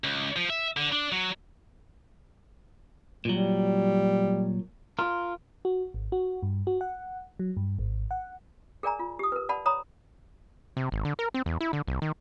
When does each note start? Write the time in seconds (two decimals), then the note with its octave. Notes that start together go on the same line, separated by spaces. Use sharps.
0.04 C#2
0.36 F3
0.50 E5
0.77 D3
0.92 D4
1.12 F#3
3.25 A#2 F#3 G3
4.99 F4 A#4
5.65 F#4
5.94 G#1
6.12 F#4
6.43 G2
6.67 F#4
6.81 F#5
7.39 F#3
7.57 G2
7.79 G#1
8.11 F#5
8.83 G#4 A#4 D5 G#5 A#5
8.99 F4
9.19 G4 D#6
9.32 A#4 B4
9.49 D5 F#5 A5 B5
9.66 C#5 A#5 B5 D#6
10.77 C3
10.92 G#1
11.05 D3
11.19 A#4
11.34 C4
11.46 E2
11.61 E4
11.73 D3
11.87 C2
12.02 D#3